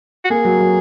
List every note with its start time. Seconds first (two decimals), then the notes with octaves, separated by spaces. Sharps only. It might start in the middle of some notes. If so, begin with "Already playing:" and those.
0.25 F#4
0.30 A#3 G#4
0.45 F#3
0.60 F#3